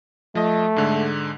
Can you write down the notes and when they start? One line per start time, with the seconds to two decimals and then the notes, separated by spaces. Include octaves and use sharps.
0.35 F3 A3 D#5
0.76 G#2 D3 G#3